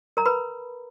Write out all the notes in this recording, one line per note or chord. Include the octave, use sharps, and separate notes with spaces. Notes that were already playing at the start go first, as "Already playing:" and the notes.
A#4 A#5
B4 B5